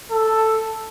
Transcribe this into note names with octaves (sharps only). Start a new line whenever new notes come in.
A4